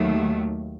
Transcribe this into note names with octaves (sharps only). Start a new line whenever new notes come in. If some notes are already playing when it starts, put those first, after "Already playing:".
Already playing: D#2 D#3 F#3 A3